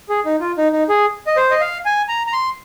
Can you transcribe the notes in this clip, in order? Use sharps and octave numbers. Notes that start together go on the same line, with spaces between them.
G#4
D#4
F4
D#4
D#4
G#4
D#5
C5
D#5
F5
G#5
A#5
A#5
C6